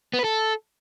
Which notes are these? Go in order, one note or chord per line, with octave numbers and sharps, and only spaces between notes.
B3
B4
A4